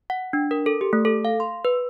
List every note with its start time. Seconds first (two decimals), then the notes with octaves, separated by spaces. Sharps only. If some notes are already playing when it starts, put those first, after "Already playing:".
0.10 F#5
0.33 D4
0.51 A#4
0.66 A4
0.81 G4
0.93 A3
1.05 A4
1.25 F5
1.40 C6
1.65 B4